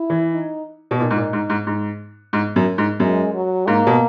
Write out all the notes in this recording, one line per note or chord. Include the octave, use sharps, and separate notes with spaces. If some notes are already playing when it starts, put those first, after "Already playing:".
Already playing: E4
E3
D#4
B2
A#2 D#4
G#2
A#2
G#2
G#2
G#2
G#2
F#2
G#2
F#2 G#3
F#3
G#2 A#3
B2